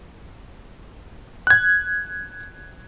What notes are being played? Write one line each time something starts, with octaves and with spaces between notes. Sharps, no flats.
F#6 G#6